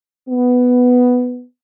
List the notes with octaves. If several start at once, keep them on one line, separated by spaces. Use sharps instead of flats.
B3